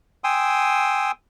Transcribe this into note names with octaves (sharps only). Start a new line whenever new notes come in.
G5 G#5 C6 D#6 E6